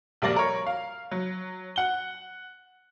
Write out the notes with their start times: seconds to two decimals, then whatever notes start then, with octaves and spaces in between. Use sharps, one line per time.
0.22 A#1 G3 A#3 D5 A#6
0.36 A#4 C#5
0.66 F5
1.11 F#3
1.76 F#5 G7